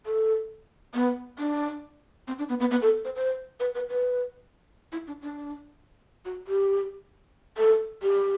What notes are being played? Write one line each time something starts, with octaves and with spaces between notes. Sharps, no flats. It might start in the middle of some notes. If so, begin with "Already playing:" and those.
A4
B3
D4
C4
D4
B3
B3
B3
A4
C5
C5
B4
B4
B4
E4
D4
D4
F#4
G4
A4
G4